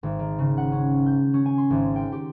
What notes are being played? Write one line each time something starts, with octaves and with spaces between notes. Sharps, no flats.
G#1
D#3
C#3
F#5
C#4
G6
C#4
G#5
C6
G#1
G5
G4